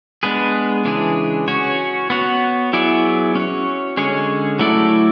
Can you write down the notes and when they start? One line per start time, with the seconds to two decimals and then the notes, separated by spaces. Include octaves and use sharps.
0.23 G#3 B3 D4 G#4 B4
0.85 C#3 E3 G#3 D4 G#4
1.48 C#4 F#4 C#5
2.10 B3 F#4 C#5
2.73 F#3 B3 E4 G#4 D5
3.35 C#4 F#4 C#5
3.97 D3 G#3 C#4 G#4 C#5
4.59 F#3 A3 E4 A4 D5